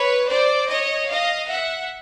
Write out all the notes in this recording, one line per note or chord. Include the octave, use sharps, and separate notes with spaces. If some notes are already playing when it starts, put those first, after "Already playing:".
Already playing: B4 C#5
C5 D5
C#5 D#5
D#5 F5
E5 F#5